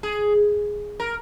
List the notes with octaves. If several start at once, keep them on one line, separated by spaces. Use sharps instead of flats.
G#4
A#4